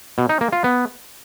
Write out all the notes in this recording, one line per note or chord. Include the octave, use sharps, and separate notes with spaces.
B2
D#4
A#3
F4
B3